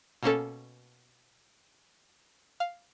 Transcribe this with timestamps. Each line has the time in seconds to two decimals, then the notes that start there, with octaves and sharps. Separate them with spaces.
0.23 B2 A#3 C#4 A4
2.60 F5